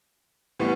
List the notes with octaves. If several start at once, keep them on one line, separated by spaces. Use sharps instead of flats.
A2 E3 G3 B3